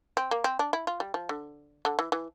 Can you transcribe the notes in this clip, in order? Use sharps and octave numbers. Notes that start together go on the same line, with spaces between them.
C4
A#3
C4
D4
E4
F4
G3
F3
D3
D3
E3
E3